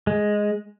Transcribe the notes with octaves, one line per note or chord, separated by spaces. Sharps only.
G#3